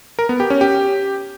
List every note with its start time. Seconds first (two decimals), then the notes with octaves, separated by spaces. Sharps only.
0.19 A#4
0.29 B3
0.40 G4
0.50 C#4
0.61 G4